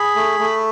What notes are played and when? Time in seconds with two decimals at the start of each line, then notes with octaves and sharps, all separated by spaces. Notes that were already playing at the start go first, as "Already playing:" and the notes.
Already playing: G#4 B5
0.16 A3
0.39 A3